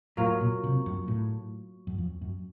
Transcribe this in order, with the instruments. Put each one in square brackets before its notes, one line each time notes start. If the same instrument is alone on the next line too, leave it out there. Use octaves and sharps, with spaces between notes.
[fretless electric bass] A2 [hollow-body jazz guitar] F#3 A#3 F4
[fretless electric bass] A#2
C3
F#2
A2
F#2
F2
F#2